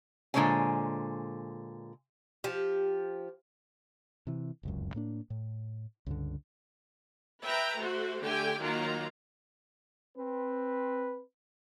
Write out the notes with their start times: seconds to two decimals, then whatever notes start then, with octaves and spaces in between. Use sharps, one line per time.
0.34 A#2 D3 G#3 C5 C#5 G#5
2.44 F3 G4
4.27 C3 E3
4.63 F1 C#2 F#2
4.94 A2 A#3 D4
5.30 A2
6.06 C#2 G2 D3
7.41 B4 E5 G5 A#5
7.78 A3 F#4 C5
8.22 D3 A3 G4 G5 G#5
8.59 D#3 F#3 A#3 F4 A#5
10.17 C4 B4